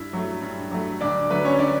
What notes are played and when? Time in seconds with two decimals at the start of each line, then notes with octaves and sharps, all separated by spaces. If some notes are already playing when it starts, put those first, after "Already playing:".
Already playing: G2 E4 E5
0.13 F#3 A3
0.42 G2
0.71 F#3 A3
1.01 D2 D4 D5
1.30 D3 F#3 A3 B4
1.45 C#4 C#5
1.59 D4 D5